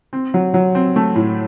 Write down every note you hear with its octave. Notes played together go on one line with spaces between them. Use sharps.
C4
F#3
F#3
C4
A3
A2